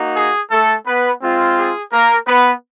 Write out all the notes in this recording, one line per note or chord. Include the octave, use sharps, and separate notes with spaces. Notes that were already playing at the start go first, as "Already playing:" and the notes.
Already playing: A#3 D#4 F#4
G#4
A3 A4
B3 B4
G#3 C4 F4
G#4
A#3 A#4
B3 B4